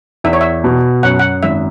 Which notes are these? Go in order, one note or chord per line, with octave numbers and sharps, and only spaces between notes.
E2 E5
C#5
E5
B2
F#2 F#5
F#5
G#1 E5